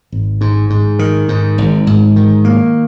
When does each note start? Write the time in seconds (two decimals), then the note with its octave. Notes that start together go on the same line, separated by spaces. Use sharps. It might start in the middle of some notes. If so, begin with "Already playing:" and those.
0.12 G#1
0.41 G#2
0.70 G#2
0.99 D#3
1.29 G#2
1.58 G#1
1.87 G#2
2.16 D#3
2.45 A#3